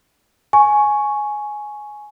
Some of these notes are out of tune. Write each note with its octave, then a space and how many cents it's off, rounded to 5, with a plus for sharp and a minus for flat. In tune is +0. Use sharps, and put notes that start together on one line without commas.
G#5 +10 C#6 +0